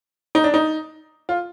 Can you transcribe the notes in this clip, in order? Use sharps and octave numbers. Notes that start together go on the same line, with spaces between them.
D#4
D4
D#4
F4